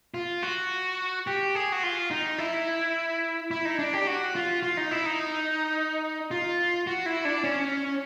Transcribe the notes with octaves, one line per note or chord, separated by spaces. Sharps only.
F4
F#4
G4
G#4
F#4
F4
D#4
E4
E4
D#4
D4
G4
F#4
F4
F4
D#4
E4
D#4
F4
F#4
E4
D4
C#4